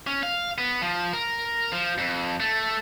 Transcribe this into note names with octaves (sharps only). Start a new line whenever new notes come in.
C#4
F5
B3
F3
A#4
F3
F2
A3